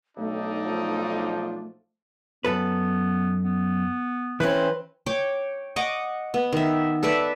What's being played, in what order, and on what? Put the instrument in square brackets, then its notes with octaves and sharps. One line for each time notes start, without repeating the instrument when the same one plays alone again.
[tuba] B1 [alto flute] A3 [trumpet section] D4 D#4
[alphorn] F3
[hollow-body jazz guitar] F#2 A4 B4 [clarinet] B3
[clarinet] B3
[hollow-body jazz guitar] E3 C#4 [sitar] C4 B4
[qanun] C#5 G5 D6
D#5 F#5 C#6 D6
B3
D#3 E5
A4 B4 D5 E5